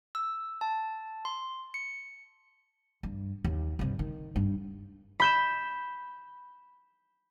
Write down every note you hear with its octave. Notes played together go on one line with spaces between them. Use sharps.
E6
A5
C6
C#7
G2
D#2
G2 C3
D#3
G2
B5 G6 E7